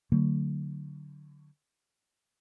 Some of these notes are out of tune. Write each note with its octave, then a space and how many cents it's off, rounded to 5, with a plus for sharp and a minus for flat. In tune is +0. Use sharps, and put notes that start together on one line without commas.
D3 +0 F#3 +0 A3 +35